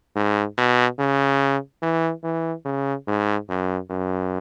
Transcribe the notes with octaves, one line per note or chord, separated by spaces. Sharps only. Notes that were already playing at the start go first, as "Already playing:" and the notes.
G#2
B2
C#3
E3
E3
C#3
G#2
F#2
F#2